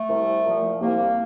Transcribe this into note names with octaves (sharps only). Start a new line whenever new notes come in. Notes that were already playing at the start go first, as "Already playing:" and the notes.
Already playing: A3
C2
A#2 F3
C2 A#3